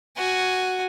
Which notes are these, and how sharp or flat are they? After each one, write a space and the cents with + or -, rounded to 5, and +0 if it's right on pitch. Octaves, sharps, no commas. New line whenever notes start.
F#4 +0 G#5 +0